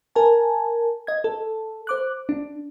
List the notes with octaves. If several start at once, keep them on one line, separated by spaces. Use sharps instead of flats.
A#4 G#5 A5
D#5 G#6
A4
C5 D6 F#6
D4